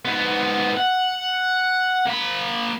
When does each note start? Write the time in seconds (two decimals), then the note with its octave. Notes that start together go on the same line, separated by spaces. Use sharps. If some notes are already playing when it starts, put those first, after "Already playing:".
0.05 G#2 B3
0.77 F#5
2.06 A#3 B5